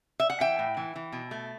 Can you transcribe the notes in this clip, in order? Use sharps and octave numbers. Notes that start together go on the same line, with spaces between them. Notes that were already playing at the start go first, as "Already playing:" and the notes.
E5
F#5
E3 E5 G5
A2
E3
E3
B2
A3